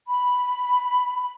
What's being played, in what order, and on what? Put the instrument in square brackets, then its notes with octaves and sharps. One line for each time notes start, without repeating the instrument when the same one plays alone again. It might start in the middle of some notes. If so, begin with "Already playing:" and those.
[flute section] B5